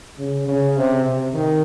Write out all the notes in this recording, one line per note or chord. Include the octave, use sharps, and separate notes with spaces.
C#3
C#3
C3
C3
D#3